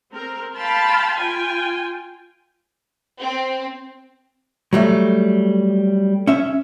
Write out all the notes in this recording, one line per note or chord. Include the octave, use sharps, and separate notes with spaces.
C4 A#4
F5 G5 A5 B5 C6
F4 G5 G#5
C4
F#3 G3 A3
C#4 E5